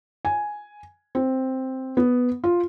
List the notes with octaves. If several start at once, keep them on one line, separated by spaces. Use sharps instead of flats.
G#5
C4
B3
F4